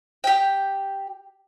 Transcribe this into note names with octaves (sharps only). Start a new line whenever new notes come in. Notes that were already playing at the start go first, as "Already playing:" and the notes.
G4 G5